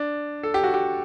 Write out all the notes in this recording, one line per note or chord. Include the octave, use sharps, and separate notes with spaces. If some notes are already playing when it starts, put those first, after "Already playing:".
Already playing: D4
A4
G4
F#4
G4